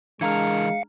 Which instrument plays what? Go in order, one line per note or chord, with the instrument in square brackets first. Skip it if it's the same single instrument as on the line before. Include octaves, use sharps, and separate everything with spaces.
[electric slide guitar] E3 A#4 [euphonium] G#3 [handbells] D4 A#5 F6 [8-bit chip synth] F5 C#7